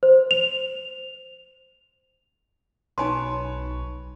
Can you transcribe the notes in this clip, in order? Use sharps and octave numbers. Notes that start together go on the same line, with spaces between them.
C5
F7
B1 D#4 B4 C#5 G#5 A5 C6